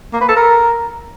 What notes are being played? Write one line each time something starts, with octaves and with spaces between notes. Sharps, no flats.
A#3
B4
A4
A#4